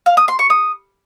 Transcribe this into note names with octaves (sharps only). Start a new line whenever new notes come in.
F5
D#6
C6
C#6
D#6